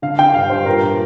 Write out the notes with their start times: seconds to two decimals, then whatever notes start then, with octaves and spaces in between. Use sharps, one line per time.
0.02 D3 F5
0.19 D3 G5
0.34 G2 F5
0.50 G2 C5
0.66 A#2 A#4
0.82 A#2